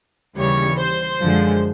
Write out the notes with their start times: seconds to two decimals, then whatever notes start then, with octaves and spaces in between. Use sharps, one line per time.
0.36 D#2 C#3 E3 G3 C#5
0.78 C5
1.20 F#2 D3 F3 G#3